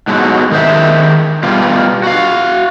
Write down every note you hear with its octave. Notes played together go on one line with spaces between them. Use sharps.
G#2 B2 F#3 G#3
D#3 G#4 C5 E5
B2 G3 F4
F#4 F5